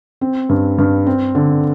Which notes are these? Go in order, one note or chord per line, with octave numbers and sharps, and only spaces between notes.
C4
G2
G2
C4
D3